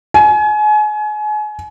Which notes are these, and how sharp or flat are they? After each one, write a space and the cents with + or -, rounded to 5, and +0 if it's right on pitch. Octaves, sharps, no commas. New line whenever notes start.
G#5 +35